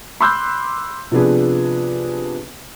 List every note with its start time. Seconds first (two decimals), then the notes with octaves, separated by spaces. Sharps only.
0.21 B5 C6 D6 E6 F#6 G6
1.11 C3 F3 B3 D4 G#4 B4